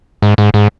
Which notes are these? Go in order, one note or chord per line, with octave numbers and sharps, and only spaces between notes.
G#2
G#2
G#2